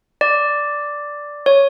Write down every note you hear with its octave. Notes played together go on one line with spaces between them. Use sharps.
D5
C#5